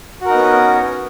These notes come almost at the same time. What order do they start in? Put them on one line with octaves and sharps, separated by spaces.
F#4 A#4 D#4 B3 C#4